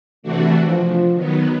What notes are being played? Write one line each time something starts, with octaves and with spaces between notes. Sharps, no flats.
C3 E3 A3 D4 F#4
F3
D#3 F#3 B3